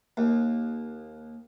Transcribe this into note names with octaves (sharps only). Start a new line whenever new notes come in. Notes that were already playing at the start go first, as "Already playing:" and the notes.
D#2